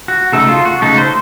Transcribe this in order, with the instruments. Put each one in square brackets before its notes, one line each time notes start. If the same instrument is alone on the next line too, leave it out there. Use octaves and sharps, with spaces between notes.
[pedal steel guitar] F#4
C#3 A3 D#4 A4
F4
F#4
C#3 A3 D#4 A4
C5